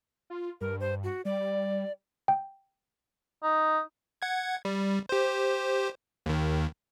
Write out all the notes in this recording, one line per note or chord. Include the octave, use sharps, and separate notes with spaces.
F4
G2 A#4
C5
F#4
G3 D5
G5
D#4
F#5 G#6
G3
G4 C5
D#2 D#3